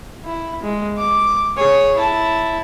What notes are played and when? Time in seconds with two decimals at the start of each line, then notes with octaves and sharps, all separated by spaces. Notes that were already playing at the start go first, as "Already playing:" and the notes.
0.25 E4
0.63 G#3
0.97 D6
1.57 G#4 C#5
1.96 E4 A5